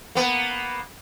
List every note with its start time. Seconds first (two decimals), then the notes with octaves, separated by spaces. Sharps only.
0.15 A#3 B3